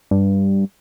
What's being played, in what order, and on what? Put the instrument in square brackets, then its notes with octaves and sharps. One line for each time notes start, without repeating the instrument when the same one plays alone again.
[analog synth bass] G2